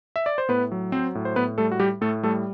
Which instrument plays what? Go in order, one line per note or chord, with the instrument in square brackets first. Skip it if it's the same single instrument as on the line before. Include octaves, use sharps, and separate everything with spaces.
[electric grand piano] E5
D5
C5
A2 B3 B4
F#3
F#3 C4 C5
A2
C5
A2 B3 B4
G3 A3 A4
F#4
G3 G4
A2 A3 A4
G3 A3 A4